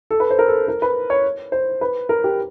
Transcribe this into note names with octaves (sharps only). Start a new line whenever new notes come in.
A4
B4
C5
A#4
A4
A#4
B4
C#5
C5
B4
A#4
G4